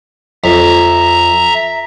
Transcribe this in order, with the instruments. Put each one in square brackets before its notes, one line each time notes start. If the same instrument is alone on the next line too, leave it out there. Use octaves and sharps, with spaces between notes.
[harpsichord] F2 [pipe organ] E5 A#5